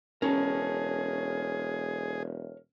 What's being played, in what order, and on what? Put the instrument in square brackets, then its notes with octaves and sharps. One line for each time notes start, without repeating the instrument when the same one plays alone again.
[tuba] E1 [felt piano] C#4 [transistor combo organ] G#4 [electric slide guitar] A#4 C#5 A5